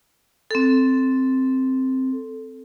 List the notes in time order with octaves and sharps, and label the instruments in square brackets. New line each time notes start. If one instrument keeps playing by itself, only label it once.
[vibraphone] C4 A4